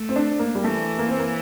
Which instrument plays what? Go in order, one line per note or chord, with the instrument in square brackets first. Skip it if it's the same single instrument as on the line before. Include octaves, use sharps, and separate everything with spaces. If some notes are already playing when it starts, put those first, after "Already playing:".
Already playing: [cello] A3
[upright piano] C4
D4
A#3
G3
[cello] E3 [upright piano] A3
[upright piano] A#3
C4
A#3